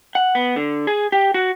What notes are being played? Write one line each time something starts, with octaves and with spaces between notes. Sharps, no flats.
F#5
B3
D3
G#4
G4
F#4